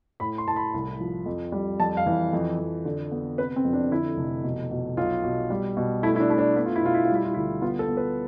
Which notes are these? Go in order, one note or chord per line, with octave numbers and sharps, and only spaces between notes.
A2 B5
C6
A2 A5
B5
C2
F3
F2
G3
F2 A5
F5
E3
F2
F2
D3
B3
C3 B4
C4
F2
D4
D3 E4
F1
B2
B2
B1 F4
B2
G3
B2
A3 E4
E4
D4
A3 E4
D4
B3 E4
F4
E4
B2 F4
E4
F4
G3
E4
F4
D2 E4
B3 F4
A4
B3
B4